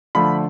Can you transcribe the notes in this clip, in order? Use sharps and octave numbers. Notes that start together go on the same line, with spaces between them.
D3 F3 A3 B5